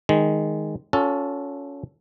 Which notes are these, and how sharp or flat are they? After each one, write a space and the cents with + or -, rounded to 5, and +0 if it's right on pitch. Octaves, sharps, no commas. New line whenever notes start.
D#3 +0 G#3 +0
C#4 +20 F4 +35 A4 +0